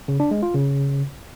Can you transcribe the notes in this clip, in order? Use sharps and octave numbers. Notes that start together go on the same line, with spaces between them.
C#3
D4
G#3
F4
C#3